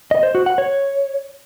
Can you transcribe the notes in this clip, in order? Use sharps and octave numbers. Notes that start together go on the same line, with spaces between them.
D#5
C5
F#4
F#5
C#5